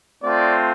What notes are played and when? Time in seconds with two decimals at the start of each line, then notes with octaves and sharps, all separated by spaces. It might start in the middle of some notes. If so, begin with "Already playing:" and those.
0.21 A3 C4 F4 D5